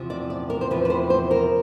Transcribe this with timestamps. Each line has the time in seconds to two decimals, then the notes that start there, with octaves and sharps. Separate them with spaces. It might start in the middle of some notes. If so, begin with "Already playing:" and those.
Already playing: E2 C3 F3
0.10 D5
0.30 D5
0.50 A#4
0.61 C5
0.70 E2 C3 F3 B4
0.85 B4
0.90 C5
1.10 C5
1.31 A#4